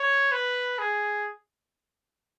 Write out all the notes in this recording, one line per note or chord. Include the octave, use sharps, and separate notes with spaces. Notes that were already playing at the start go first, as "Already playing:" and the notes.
Already playing: C#5
B4
G#4